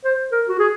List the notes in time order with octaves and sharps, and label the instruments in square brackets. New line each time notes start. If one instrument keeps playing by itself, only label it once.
[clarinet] C5
A#4
F#4
G#4